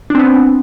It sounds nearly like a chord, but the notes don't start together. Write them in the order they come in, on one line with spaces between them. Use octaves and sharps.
D4 C4 B3